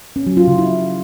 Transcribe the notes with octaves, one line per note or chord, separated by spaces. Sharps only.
C#4
F#3
F4
C#3
E4